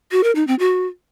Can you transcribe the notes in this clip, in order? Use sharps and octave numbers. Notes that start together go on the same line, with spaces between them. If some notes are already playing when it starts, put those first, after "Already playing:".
F#4
A#4
D#4
C4
F#4